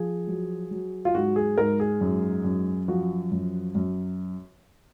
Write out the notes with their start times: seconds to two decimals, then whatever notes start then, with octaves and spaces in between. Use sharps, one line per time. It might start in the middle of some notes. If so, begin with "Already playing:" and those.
Already playing: F3 G#4
0.27 F#3
0.71 F#3
1.05 F4
1.14 G#2 F#4
1.36 G#4
1.58 G#2 A#4
1.80 G#4
2.01 F#2
2.44 F#2
2.88 F3 F#4
3.31 F#2
3.75 F#2